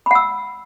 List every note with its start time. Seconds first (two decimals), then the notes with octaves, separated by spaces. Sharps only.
0.06 B5
0.11 F#5
0.15 E6